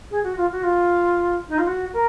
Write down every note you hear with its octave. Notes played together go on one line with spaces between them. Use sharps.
G#4
F#4
F4
F#4
F4
D#4
F4
F#4
A#4